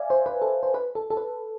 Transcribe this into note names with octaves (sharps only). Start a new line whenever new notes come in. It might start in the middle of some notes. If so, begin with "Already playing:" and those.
Already playing: D5 E5 F5 G#5
C5
B4
A4
C5
B4
A4
A4
B4